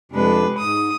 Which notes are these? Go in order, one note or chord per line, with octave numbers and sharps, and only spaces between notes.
F2 C3 G#3 D4 B4
G#2 D#6